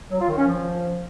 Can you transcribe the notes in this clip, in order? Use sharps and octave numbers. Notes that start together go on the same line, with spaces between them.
F#3
F4
D#3
C#4
F3